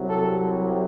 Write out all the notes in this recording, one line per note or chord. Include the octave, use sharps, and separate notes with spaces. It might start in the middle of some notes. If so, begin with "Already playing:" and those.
Already playing: C2 C3 F#3
A4